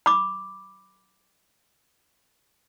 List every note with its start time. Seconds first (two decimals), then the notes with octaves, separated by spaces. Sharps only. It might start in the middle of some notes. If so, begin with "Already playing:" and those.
0.06 B5 D6